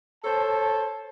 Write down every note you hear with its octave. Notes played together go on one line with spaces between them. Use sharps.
A4 C5 C#5 A5